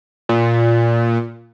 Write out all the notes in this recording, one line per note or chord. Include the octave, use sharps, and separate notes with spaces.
A#2